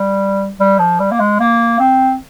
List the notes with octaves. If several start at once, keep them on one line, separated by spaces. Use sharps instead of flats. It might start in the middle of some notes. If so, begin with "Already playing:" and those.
Already playing: G3
G3
F3
G3
A#3
G#3
A#3
C4